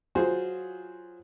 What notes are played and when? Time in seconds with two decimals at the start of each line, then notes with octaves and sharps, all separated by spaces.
0.15 F#3 F4 F#4 G#4 C5